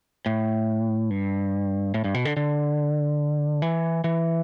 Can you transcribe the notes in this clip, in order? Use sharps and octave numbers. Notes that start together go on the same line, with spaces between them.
A2
G2
A2
G2
B2
D3
D3
E3
E3